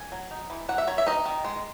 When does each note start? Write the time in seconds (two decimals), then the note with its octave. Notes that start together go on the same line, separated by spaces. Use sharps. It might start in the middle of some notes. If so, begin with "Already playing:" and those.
Already playing: G#5
0.12 F#3
0.31 D#4
0.50 E3
0.69 F#3 F#5
0.78 E5
0.87 F#3 C#5
0.98 E5
1.07 D#4 D#5
1.26 D#3
1.44 G#3